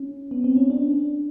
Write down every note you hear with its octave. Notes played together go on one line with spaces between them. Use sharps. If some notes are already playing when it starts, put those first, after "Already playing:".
Already playing: C#4
B3
C4
C#4
D4